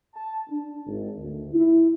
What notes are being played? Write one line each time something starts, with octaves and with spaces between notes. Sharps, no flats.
A5
D4
G#1
D2
E4